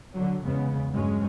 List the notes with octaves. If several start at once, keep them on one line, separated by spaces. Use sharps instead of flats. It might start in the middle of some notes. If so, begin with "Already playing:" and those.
D3 F#3
E2 C#3 G#3 B3
G2 F#3 G#3 C#4